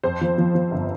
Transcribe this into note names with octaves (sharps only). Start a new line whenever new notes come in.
F2 C5
F3
F3
F3
G1